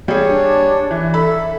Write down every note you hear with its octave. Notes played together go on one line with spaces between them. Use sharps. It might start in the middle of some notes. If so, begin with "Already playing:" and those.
G3 G#4 C#5
D4
E3
A4 E5 B5